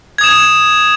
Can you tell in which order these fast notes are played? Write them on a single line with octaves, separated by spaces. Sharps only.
G#6 D#6 E7